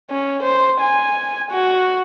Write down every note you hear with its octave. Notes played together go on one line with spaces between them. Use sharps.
C#4
C5
G#5
F#4